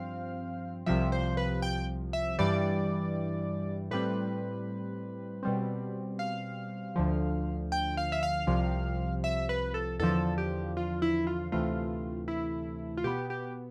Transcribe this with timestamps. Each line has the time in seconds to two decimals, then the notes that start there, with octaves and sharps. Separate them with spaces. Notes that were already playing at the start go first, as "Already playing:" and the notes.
Already playing: G2 F3 C4 F5
0.86 C2 C3 F3 E5
1.12 C5
1.37 B4
1.62 G5
2.13 E5
2.38 G2 E3 G3 D5
3.91 A2 G3 C4 B4
5.43 B2 G3 C4
6.19 F5
6.96 D2 D3 F3
7.72 G5
7.97 F5
8.12 E5
8.23 F5
8.47 C2 C3 F3
9.24 E5
9.49 B4
9.74 A4
9.99 E2 D3 F3 A4
10.38 G4
10.77 F4
11.02 E4
11.27 F4
11.52 D2 C3 E3 A3 F4
12.28 E4
12.97 F4
13.04 B2 B3 G4
13.30 G4